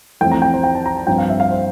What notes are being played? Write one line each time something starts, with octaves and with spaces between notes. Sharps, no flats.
F2 E3 A3 C4 G5
A#5
G5
C5
G5
A5
A#5
A5
G2 F3 C4 G5
F5
E5
F5
C5